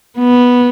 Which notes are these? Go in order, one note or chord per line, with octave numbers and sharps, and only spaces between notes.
B3